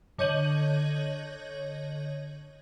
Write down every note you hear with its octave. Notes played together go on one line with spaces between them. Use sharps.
D3 C#5 D#5 G6 D#7 F#7